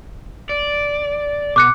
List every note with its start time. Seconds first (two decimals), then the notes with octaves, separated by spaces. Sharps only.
0.49 D5
1.56 B2 D6 F#6 C#7